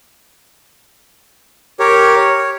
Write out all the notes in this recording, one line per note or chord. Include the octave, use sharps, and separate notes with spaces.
G4 A#4 C#5
C#5